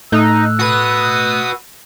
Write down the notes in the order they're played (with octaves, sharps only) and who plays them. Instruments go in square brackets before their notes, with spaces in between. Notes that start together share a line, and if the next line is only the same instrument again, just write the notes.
[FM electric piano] A2 A3 [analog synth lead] D#4 [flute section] E6 F#6
[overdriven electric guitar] F#4 B4 [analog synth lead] D#6